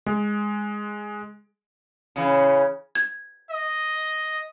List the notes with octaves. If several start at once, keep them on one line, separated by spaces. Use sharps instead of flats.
G#3
C#3 E3
G#6
D#5